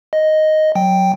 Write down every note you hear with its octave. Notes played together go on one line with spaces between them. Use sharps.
D#5
F#3 G5